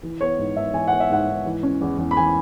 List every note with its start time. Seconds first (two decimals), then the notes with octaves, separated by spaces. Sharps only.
0.03 E3
0.21 B3 C#5
0.38 G#2
0.56 G#2 E5
0.73 E3 G#5
0.88 B3 F#5
1.00 E5
1.10 G#2 F#5
1.27 G#2
1.46 E3
1.63 C#4
1.81 E2
1.98 E2
2.11 B5
2.17 E3 G#5